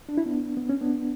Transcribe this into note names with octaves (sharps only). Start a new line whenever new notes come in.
D4
E4
B3 D4
B3
C#4
B3 D4